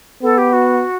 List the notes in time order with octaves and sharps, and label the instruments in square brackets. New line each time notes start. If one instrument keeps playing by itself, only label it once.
[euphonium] B3 [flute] A4
[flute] G4
F#4